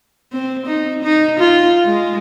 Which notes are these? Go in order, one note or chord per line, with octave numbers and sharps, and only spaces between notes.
C4
D#4
D#4
F4
G#3